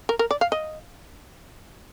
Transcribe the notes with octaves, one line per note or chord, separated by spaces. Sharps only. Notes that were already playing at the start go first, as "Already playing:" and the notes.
A#4
A#4
D5
F5
D#5